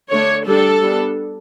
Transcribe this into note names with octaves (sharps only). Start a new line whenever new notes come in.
D3 A3 D4 C#5
G3 D4 A4
G3 B3 D4